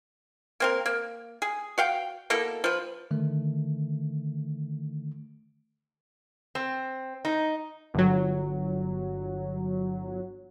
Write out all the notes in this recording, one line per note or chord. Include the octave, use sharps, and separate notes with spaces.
A#3 C4 A#4
A#3
G#4
F#4 F5 G5
B2 A#3 E4 A4
F3 B4
D3 D#3 A3
C4
D#4
G1 F#3